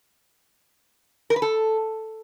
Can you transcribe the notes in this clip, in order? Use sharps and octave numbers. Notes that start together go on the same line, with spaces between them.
A#4
B4
A4